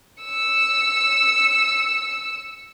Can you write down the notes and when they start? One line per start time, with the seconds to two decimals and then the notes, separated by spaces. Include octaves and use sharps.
0.22 E6 C#7